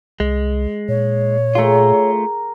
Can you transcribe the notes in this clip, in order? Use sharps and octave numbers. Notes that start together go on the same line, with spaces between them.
C2 G#3
A#2 C#5
A3 F4 G#4 A#4